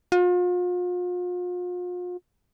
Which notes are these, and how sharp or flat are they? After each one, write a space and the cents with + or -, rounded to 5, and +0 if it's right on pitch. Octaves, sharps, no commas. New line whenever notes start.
F4 +40